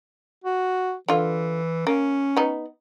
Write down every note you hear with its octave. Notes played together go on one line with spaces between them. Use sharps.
F#4
D3 E3 F4
A#3 C#4
B3 D#4